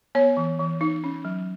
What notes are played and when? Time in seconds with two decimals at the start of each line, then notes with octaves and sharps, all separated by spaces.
0.15 B3 C#5
0.37 E3
0.59 E3
0.81 D#4
1.04 C#4
1.25 F#3